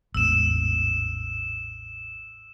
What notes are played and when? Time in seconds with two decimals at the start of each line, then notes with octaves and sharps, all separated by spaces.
0.14 A1 E2 G#2 E6 E7